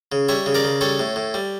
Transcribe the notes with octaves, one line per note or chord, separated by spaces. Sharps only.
C#3
G3 C#5 E5
C#3
A#4 D5
C#3
G3 A4 C#5
A2
A2
G3